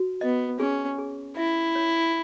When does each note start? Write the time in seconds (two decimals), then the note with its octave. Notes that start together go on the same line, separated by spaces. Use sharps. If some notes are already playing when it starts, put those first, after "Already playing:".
Already playing: F#4
0.21 B3 D#5
0.60 C#4 G#4
0.98 G#4
1.37 E4 E5
1.76 C#5